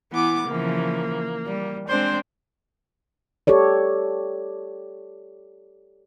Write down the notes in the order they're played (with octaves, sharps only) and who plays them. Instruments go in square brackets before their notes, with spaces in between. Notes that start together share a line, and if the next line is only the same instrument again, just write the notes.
[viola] E3 D6 [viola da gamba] B3
[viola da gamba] C#3 E3 F3 [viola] A#3
[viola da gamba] G3
[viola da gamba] G#3 C4 D4 [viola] C5
[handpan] G4 A4 C#5 D5